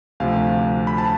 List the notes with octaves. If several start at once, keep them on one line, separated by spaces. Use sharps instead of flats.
D2 C3 F3 F5
B5
A5